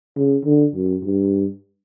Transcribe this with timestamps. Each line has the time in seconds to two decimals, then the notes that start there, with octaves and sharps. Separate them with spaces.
0.17 C#3
0.45 D3
0.75 F#2
1.04 G2